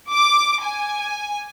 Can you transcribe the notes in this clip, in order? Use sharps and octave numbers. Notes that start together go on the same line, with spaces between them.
D6
G#5